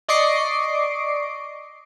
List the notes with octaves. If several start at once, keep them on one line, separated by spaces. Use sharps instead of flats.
D5 D#5 C#6 D6 C7 D7